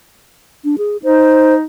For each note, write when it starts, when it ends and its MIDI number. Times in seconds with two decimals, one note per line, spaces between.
0.65 0.76 62
0.78 0.97 68
1.03 1.65 63
1.03 1.55 72